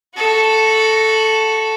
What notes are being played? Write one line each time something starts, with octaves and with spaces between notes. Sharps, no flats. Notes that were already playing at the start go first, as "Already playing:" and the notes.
F#4 A4